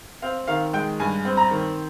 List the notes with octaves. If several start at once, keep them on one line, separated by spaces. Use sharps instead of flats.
C4 F5
D#3 F5
G#3 G5
G2 G#5
C4
A#5
D#3